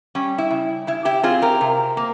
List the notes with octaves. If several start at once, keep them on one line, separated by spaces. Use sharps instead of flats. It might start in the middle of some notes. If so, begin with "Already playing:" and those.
G3 C#4
E4
C#3
C#3 E4
E4 G4
C4 F4 G#4
G4 A#4
C3
A#3